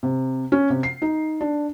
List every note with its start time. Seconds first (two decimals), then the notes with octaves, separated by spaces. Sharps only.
0.03 C3
0.52 C#4
0.70 C3
0.83 C7
1.02 D#4
1.41 D4